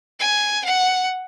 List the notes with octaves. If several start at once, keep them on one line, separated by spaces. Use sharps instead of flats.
G#5
F#5